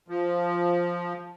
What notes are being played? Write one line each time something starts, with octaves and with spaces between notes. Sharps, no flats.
F3